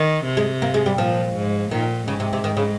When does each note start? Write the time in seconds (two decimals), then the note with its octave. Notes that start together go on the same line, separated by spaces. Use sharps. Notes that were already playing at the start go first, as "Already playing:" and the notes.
Already playing: D#3
0.25 C3
0.37 G#3
0.62 A#3
0.74 G#3
0.86 G3
0.98 A#2 F3
1.35 G#2
1.71 A#2 D#3
2.08 G#2 C#3
2.20 C3
2.33 C3
2.44 D#3
2.57 C#3